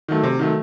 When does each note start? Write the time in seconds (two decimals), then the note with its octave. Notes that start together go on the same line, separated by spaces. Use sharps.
0.08 D#3 F#3 A3
0.23 C3
0.39 D#3 F#3 A3